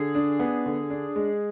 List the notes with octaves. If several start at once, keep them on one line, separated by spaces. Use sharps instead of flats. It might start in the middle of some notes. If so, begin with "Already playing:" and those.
Already playing: D3 G#4
D4
B3
D3
D4
G#3